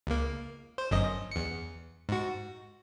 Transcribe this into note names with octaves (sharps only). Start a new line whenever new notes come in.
C#2 A#3
C5
G1 F#2 D#5
E2 C#7
G#2 F#4